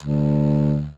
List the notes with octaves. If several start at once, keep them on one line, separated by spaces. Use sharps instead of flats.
D2